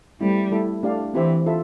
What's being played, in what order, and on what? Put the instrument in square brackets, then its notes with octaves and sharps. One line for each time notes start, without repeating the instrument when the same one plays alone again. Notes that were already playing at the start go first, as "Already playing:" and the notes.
[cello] G3 [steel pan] A3 C4 E4
[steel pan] A3 E4 A4
A3 D4 G4 D5 F5
[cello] E3 [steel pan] C4 E4 G4 C5 E5
[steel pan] F4 A4 E5